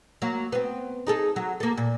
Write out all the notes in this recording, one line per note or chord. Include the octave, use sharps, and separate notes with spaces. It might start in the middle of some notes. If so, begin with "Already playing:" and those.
F#3 A#3
B3 C4
D#4 G#4 A4
F#3
A#3 A4
A#2